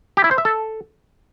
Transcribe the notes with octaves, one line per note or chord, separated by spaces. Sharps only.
G4
E4
C5
E5
A4